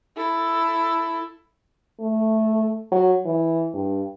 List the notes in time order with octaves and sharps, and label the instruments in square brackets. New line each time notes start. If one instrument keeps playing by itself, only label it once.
[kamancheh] E4 A4
[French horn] A3
F#3
E3
G2